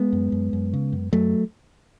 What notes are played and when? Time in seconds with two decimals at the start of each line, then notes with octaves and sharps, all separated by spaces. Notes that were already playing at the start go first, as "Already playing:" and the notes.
Already playing: G#3 B3
0.13 F#2
0.32 F#2
0.53 F#2
0.73 C#3
0.93 F#2
1.13 F#2 F#3 A3